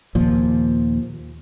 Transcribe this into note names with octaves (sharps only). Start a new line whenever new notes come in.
D#2 A#2 F3